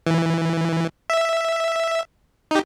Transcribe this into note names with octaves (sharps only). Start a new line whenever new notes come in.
E3
E5
D#4 G4